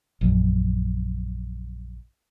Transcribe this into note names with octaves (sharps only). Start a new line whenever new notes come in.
A#1 F#2